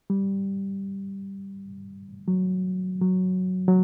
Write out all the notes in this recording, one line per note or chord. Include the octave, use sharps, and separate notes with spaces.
G3
F#3
F#3
F#3